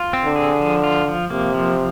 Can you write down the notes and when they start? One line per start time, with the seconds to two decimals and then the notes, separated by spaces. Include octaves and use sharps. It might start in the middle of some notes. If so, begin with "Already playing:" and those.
Already playing: F4
0.13 C4
0.25 D3
0.36 G#4
0.61 F3
0.84 F4
1.08 F3
1.30 C3 A#3
1.54 F3